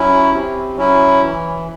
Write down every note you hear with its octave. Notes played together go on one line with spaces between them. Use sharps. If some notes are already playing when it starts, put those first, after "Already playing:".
Already playing: F#3 C#4 E4
C3
F#3 C#4 E4
E3